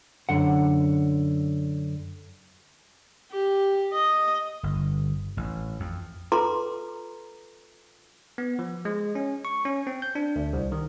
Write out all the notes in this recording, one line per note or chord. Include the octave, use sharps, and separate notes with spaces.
F#2 D3 F#5
G4
D#5
G1
A1
F2
F4 A4 B4 A#5 C6 D6
B3
F3
G#3
C#4
C#6
C#4
C4
G6
D4
D2
C2
D#3